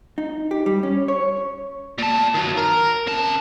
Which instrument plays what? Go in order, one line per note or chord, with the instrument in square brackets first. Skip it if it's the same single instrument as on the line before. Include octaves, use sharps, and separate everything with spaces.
[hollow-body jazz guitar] D#4
G4
G3
C#4
C#5
[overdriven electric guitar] A#2 A5
D#3 F#3
A#4
C#3 A5